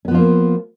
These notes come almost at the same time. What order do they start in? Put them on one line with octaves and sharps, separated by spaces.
C#4 B3 F3 F4 A#3